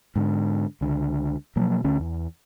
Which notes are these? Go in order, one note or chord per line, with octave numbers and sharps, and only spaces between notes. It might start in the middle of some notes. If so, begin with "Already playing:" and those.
G#2 D3
C#2 D3
B2 F3 F#3 A#3
D2 D3 C#4
E2